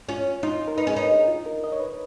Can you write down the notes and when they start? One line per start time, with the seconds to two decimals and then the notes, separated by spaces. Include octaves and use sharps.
0.09 C#4 F4
0.43 D#4 F4
0.68 A#4
0.78 D#4 B4
0.87 C#4 G#4
0.95 D#4 A#4
1.11 G#4
1.28 F4
1.46 A#4
1.64 D#5
1.72 C#5
1.80 B4